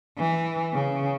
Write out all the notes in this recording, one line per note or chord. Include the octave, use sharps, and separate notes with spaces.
E3
C#3